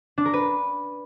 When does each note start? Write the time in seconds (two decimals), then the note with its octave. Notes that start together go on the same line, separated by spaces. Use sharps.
0.18 D4
0.26 A#4
0.34 B4